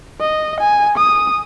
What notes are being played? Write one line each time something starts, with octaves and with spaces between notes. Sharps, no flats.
D#5
G#5
D#6